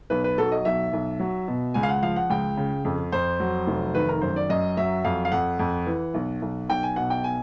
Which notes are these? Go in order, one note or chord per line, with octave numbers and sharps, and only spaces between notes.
B1 B4
B4
F#3 A4
D#5
B1 E5
B1
F#3
B2
C#2 G#5
F5
F#5
F3 F5
F#5
C#2 G5
C#3
F2
F2 C5
F#3
F1
D#3 B4
A#4
F#2 C5
D5
F#2 D#5
F#3 E5
F2 F5
F5
F2 F#5
F2
E3
B1
B1
B1 G5
G#5
B2 F#5
G5
G#5